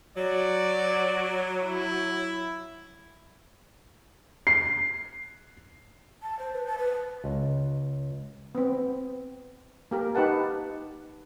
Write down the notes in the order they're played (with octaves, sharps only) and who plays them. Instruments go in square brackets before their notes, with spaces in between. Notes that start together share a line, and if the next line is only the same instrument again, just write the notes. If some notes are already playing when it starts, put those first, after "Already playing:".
[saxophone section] F#3 [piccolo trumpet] D5
[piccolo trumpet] E4
[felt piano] C7
[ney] A5
C5
B4
A5
B4
[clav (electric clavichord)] C#2
[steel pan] B3 C4
A#3 G4 A#4
D#4 G4 B4 F#5 A5